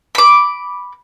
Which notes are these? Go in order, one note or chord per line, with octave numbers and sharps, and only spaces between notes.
B5 D6